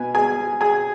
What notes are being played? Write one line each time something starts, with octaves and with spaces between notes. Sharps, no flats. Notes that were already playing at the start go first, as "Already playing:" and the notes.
Already playing: B2 B3 G#5
G#4 G#5
G#4 G#5